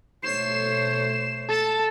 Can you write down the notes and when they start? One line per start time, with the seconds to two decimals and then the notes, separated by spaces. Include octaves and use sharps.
0.23 B2 A3 C5 C#5 C7 E7
1.49 A4 A5